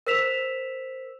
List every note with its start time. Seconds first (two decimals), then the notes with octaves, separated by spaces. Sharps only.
0.07 A#4 C5 E6 B6 E7 F7